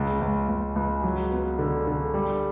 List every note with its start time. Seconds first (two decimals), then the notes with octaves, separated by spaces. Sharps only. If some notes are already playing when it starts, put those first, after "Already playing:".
Already playing: C#2 C#3
0.21 C#2
0.49 C#2
0.76 C#2
1.04 F#3
1.32 B3
1.59 D3
1.87 D3
2.14 G3